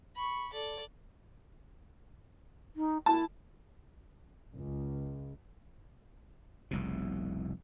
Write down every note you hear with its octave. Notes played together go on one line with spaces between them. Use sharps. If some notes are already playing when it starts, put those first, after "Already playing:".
B5 C#6
A4 D5
D#4
E4 A5
C#2
F1 C2 B2